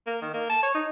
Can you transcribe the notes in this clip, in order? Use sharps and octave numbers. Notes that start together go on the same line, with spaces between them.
A#3
D#3
A#3
A5
C#5
D#4